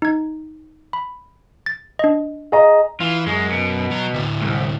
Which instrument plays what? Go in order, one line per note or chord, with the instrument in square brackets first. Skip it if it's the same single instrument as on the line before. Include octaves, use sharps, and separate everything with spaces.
[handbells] D#4 G#6
B5
A6
D4 D#5
[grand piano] G#4 D#5 A#5 [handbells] F5
[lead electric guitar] E3 [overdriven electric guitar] F4
[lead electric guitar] F#2 [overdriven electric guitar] G#3
[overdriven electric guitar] B2
[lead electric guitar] F#3
D2 A2
[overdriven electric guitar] C2 G#2